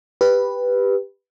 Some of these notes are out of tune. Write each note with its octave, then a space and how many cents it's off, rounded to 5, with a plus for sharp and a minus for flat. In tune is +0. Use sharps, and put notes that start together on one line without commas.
G4 +10 B4 +0